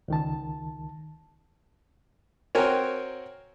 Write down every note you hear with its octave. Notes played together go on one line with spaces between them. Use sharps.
C#2 D#3 A5
C4 F#4 A#4 C#5 G5 G#5